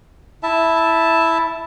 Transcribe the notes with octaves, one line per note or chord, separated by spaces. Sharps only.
E4 E5 A5